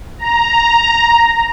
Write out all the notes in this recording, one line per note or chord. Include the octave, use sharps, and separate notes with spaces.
A#5